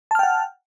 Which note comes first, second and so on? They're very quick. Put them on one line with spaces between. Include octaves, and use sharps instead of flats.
A5 F6 G5 F#5